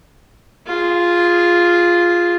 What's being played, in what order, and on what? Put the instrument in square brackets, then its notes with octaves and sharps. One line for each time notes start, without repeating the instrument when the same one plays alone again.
[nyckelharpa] F4 G#4